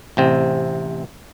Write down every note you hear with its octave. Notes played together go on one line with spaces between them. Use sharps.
A1 C3 C4